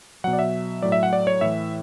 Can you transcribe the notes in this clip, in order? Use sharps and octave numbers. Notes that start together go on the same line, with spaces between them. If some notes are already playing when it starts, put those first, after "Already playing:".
B2 F#3 F#5
D5
E5
A2 F#3 D5
E5
F#5
D5
C#5
A2 E3 E5